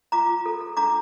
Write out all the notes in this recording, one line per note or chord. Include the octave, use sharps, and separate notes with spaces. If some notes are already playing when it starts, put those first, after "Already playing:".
F4 A#5 D6
F4
A4
A4
D4 A#5 D6